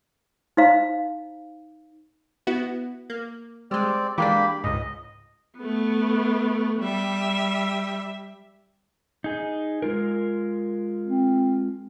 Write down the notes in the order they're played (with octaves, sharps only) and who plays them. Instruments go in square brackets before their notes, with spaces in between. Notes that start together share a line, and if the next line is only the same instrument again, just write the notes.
[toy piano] D#4 C5 F5 A#5
[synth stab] B3 E4 F#4
A#3
[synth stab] G3 G#3 [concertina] C4 D5
[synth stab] E3 G#3 D4 [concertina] A#3 G4 B5
[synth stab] C#2 G#2 [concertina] D#5
[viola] A3 B3
G3 E5
[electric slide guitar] D#4 G#4
G#3 F4 A#4
[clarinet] C4